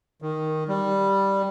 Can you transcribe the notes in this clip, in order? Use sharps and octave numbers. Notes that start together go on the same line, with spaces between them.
D#3
G3